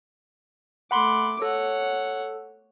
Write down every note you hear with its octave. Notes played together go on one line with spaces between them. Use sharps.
A3 F#5 B5 C6 D6
A4 C#5 F#5